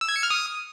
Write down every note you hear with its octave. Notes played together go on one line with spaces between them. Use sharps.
E6
G#6
C#7
F6
D#6